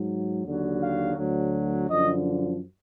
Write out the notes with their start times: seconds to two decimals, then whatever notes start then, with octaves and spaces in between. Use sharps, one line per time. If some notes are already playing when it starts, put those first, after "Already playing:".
Already playing: G#2 F#3
0.46 D#2 D3 F#3
0.82 F5
1.17 D2 D3 F#3
1.89 F#2 D3 F3 D#5